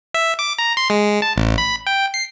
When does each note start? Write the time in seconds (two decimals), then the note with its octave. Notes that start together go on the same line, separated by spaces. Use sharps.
0.14 E5
0.39 D6
0.58 A#5
0.77 C6
0.90 G#3
1.22 A5
1.36 A1
1.58 B5
1.87 G5
2.14 C7